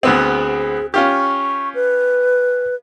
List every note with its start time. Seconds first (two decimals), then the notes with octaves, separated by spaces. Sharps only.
0.03 D2 B3 C4 G#4
0.94 C#4 F4 G4 C#6
1.75 B4